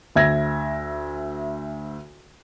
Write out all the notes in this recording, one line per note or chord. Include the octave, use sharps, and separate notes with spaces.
D2 E5 G#6 A#6